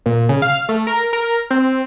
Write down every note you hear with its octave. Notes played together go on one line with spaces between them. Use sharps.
A#2
C#3
F5
A3
A#4
A#4
C4